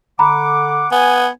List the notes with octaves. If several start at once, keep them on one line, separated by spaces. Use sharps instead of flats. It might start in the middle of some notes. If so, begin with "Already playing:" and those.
D3 F#5 A#5 B5 D6
B3 G#5